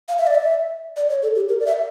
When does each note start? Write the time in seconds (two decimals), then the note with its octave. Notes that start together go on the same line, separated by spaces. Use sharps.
0.08 F5
0.18 E5
0.27 D5
0.35 E5
0.96 D5
1.10 C#5
1.22 A4
1.36 G4
1.49 A#4
1.60 D5
1.66 E5